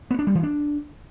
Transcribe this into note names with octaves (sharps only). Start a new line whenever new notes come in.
B3
D4
G3
E3
D4